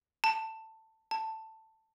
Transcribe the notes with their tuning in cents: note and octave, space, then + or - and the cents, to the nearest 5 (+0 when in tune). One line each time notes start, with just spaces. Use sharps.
A5 +15
A5 +10